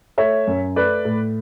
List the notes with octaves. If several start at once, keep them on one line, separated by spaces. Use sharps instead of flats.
A3 C#5 E5
F#2
A3 B4 D5
A2